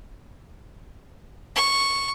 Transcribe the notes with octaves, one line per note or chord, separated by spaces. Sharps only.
C#6